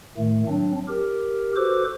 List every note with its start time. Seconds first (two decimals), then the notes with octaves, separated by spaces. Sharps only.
0.17 A2 D#3 A3
0.48 F#3 C4 D4
0.88 G4 A#4
1.56 F#4 A4 B4 C5 D6